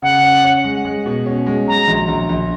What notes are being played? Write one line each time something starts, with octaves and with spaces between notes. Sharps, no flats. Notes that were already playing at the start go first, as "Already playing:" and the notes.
C#3 F#5
C#4
C#4
G#3
G#3
B2
C#4
G#3
F#3 A#5
A#1
A#1
A#1